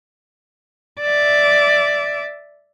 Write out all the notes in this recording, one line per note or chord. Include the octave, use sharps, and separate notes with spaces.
D5 E5